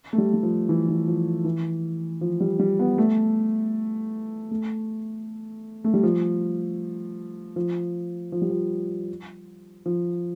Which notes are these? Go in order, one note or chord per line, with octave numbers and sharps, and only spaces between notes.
A3
G3
G3
F3
E3
E3
F3
E3
F3
G3
G3
B3
A3
A3
A3
G3
F3
F3
F3
G3
F3
F3